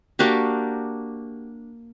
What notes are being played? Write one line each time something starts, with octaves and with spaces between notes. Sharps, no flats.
A#3 D4 F#4 G4